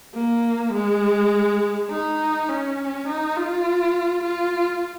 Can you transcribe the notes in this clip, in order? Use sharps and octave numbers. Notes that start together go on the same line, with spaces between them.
A#3
G#3
D#4
C#4
D#4
F4
F4